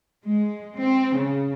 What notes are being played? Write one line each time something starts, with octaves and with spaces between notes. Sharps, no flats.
G#3
C4
C#3